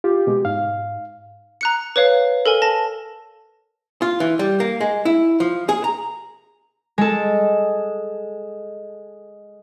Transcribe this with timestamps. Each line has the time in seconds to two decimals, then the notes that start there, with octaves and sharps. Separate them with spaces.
0.04 F4 G4
0.27 B2 G#3
0.45 G#2 F5
1.61 A#5 F#6 C#7
1.96 B4 C#5 F5
2.46 A4 A#4 G#5
2.62 A5 A#6
4.02 F4
4.20 E3
4.39 G3
4.60 A#3
4.81 G#3
5.05 E4
5.40 F3
5.69 G#4
5.84 A#5
6.98 G#3 A4